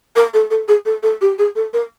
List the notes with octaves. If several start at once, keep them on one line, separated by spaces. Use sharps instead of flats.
A#4
A4
A4
G#4
A4
A4
G4
G#4
A4
A#4